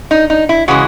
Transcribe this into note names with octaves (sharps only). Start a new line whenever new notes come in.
D#4
D#4
E4
C#3 E3 G#3 F#4